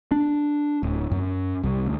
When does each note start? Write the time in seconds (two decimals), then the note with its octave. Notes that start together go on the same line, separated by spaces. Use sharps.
0.11 D4
0.83 D1
1.12 F#2
1.63 C2
1.86 D2